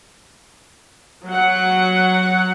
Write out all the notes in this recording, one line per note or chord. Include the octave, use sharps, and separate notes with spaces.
F#3 F#5